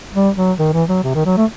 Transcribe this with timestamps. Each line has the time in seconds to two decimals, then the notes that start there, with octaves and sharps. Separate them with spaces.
0.14 G3
0.36 F#3
0.59 D#3
0.73 E3
0.88 F#3
1.03 C3
1.15 D#3
1.26 F#3
1.37 A3